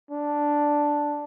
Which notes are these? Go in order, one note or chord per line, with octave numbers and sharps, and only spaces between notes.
D4